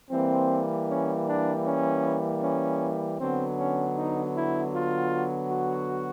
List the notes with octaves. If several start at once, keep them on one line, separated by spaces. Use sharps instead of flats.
E3 G3 A#3 C4
C#4
D4
C#4
C#4
D3 F#3 B3 C4
C#4
D#4
E4
F4
F#4